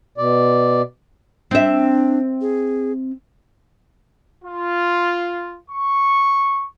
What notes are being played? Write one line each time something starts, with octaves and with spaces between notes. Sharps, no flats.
B2 D5
C4 D4 E5
G#4
F4
C#6